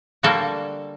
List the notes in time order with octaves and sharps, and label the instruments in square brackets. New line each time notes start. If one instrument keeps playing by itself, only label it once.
[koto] D3 G3 A#3 F#4 A4